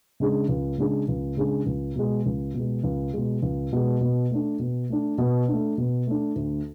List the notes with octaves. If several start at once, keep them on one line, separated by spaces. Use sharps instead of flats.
C#3 G#3 D4 G#4
C#2
C#3 G#3 D4 G#4
C#2
C#3 G#3 D4 G#4
C#2
B2 G#3
C#2
B2 G#3
C#2
B2 G#3
C#2
B2 G#3
B2
A3 D4
B2
A3 D4
B2
A3 D4
B2
A3 D4
D2